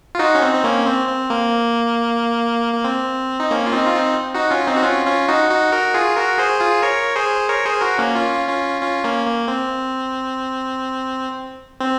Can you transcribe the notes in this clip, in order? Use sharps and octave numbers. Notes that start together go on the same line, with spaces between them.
F4
D#4 F#4
C#4
C4 D#4
C4
A#3 C#4
C4
C4
A#3
A#3
C4
D#4
A#3 C#4
F4
C4 D#4
F4
C4 D#4
D#4 F#4
C#4 F4
C4 D#4
F#4
C#4 F4
C#4 F4
D#4 F#4
D#4 F#4
F#4 A#4
F4 G#4
F#4 A#4
G#4 C5
F4 G#4
A#4 C#5
G#4 C5
A#4 C#5
G#4 C5
F#4 A#4
A#3 C#4
C#4 F4
C#4 F4
C#4 F4
A#3 C#4
A#3
C4
C4